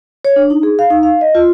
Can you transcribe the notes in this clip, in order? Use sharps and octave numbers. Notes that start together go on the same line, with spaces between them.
C#5
D4
D#4
G#4
F5
D#4
F5
D#5
F4